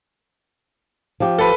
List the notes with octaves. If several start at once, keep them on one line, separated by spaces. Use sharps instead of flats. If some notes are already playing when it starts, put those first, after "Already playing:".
F3 G4
A4 B4